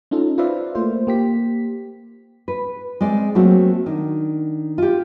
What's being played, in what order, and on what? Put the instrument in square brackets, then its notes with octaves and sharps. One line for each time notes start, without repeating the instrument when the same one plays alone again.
[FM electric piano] C#4 D#4 F4 A4
F4 B4 C5 D5 E5 F5
A3 A#3 F4 C5
A#3 G4 B6
[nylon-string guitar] B4
G#3 C4 D5
F#3 A3 A#3 C4 F#4
D#3 D4
F4 G4